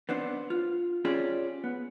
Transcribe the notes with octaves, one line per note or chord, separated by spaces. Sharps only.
B3 C4 D4 C5
F4
C4 C#4 F4 G4 G#4 D5
B3